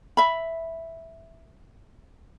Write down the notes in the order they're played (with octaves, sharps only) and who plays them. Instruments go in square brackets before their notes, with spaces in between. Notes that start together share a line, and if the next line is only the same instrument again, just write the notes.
[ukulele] E5 B5